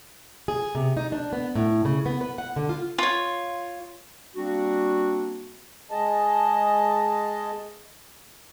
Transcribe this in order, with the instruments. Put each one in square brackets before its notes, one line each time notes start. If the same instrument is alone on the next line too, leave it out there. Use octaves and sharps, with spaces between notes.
[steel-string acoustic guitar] G#4
C3
D#4
D4
B3
A2
C#3
B3
B4
F#5
D3
F4
[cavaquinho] F4 C#5
[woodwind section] G3 A#3 C4 D4 F#4
[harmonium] G#3 G#4 D#5 A5